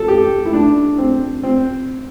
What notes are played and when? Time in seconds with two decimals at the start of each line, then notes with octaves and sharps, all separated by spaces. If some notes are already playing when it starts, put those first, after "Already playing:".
Already playing: A4
0.08 G4
0.45 E4
0.53 D4
0.98 C4
1.43 C4